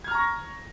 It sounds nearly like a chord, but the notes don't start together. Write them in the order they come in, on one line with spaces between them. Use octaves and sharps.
G#6 F6 A#5 C#6 A#6